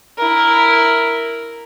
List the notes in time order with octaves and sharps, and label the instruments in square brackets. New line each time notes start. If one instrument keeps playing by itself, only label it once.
[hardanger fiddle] E4 A#4